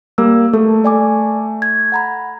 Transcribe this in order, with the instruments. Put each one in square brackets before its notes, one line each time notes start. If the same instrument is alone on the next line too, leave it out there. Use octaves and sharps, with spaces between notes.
[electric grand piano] G3 A#3 [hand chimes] E6
[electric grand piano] A3 [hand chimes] A4
[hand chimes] D5 G#5 D6
G#6
F#5 A#5 B5